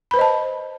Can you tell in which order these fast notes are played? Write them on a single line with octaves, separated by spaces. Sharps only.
B5 B4 C5 D#5 A5